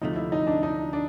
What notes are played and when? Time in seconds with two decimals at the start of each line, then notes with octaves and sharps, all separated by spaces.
0.01 D2 C3 F3 A3 D#4
0.16 E4
0.32 D#4
0.47 D4
0.63 D#4
0.93 D4